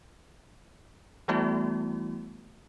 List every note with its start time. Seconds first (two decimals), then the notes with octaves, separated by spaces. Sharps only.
1.28 E3 G3 A3 B3 E4 F#4